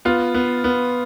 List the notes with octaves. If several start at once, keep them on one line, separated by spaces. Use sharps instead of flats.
B3 F4
B3
B3